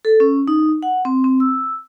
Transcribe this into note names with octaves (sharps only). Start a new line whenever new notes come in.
A4
C#4
D#4
F#5
C4
C4
E6